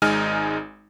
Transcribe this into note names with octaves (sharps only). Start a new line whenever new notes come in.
G#1 G#3 D#4 G#5 F6